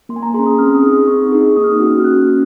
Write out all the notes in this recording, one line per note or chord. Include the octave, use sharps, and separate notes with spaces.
A#3 C6
G#5
A#5
C#4 G#4 C6
D#6
C4 F6
D#6
D#4 G#4
C4 C#6
D#4 G#4
A#3 D#6
F6
D#6
C#4 F#4
F6
A#3 F#6
C#4